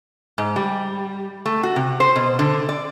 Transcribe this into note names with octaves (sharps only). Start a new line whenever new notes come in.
G#2
G3
A3
F#4
C3
C5
B2
D3
D5